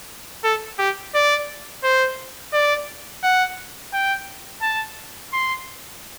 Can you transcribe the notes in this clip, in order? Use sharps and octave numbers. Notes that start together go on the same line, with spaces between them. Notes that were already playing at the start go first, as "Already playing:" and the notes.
A4
G4
D5
C5
D5
F#5
G5
A5
C6